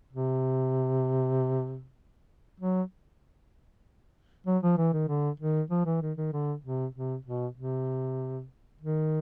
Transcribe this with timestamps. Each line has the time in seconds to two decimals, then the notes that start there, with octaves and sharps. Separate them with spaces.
0.13 C3
2.60 F#3
4.47 F#3
4.63 F3
4.78 E3
4.93 D#3
5.08 D3
5.40 D#3
5.71 F3
5.86 E3
6.01 D#3
6.17 D#3
6.33 D3
6.64 C3
6.95 C3
7.25 B2
7.57 C3
8.81 D#3